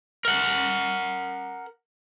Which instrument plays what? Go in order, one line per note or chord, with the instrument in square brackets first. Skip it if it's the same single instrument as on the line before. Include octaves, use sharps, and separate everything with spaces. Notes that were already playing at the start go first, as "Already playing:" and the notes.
[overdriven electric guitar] A#4 F#5